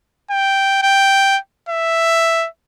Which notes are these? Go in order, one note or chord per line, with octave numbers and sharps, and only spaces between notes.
G5
G5
E5